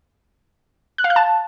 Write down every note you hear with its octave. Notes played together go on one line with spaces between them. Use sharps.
F#6
F5
F#6
A5